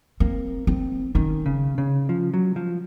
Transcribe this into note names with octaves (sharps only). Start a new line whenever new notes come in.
A#3 C4
C4
D#3 C#4
C#3
C#3
F3
F#3
F3